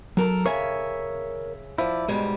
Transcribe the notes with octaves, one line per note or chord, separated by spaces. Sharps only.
F#3 A4 A#4 A#5
C#3 A#4 C#5 E5 F5 G#5
F3 E4 D5
G#2 B2 G3 G#3